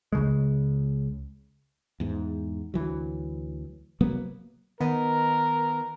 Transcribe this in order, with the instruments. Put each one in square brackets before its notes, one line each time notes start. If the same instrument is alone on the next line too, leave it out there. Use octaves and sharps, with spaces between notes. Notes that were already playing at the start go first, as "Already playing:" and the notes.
[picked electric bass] C#2 C#3 G#3
[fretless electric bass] E2 G#2
D2 E3 F#3
C3 F#3 A#3 B3
[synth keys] D#3 B3 [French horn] A#4